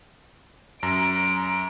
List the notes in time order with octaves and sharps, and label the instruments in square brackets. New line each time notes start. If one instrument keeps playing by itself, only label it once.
[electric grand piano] F#2 A#5 [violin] D7